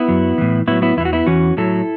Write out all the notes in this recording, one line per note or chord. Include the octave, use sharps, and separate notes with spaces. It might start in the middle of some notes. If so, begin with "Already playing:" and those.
Already playing: B3 E4
F#2 F#3
A2 E3
A2 F#3 B3 E4
B3 E4
E2 E3 E4 F#4
B3 E4
E2 E3 C#4 F#4
A2 F#3 E4 A4